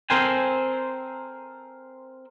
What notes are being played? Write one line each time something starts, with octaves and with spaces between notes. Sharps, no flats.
C4 A4 A#4 C5 G5 G#5